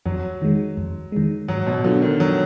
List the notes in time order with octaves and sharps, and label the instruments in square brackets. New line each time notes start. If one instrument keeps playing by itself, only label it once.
[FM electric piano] F2 [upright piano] F#3
[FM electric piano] D#3 G#3
F2
D#3 G#3
[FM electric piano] G#2 [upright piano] F#3
[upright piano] B2
[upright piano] D3 [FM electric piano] F#3 B3 F4
[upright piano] D#3
F#3